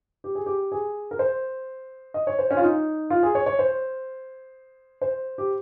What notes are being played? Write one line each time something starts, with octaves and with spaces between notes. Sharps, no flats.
G4
G#4
G4
G#4
A#4
C5
D#5
C#5
C5
C#4
F4
D#4
F4
G#4
C#5
C#5
C5
C5
G4